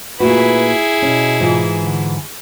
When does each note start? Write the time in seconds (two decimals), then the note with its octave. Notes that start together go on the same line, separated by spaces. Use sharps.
0.20 A#2 A3 E4 F#4 G#4 B4
1.02 B2 C#4
1.40 G#2 E3 F4
1.77 D3